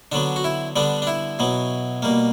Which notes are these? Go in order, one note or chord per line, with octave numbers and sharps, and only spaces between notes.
D3 F#3 B3 D4
F#4
E4
D3 G3 B3 D4
D4
E4
B2 F#3 B3
B2 G3 A#3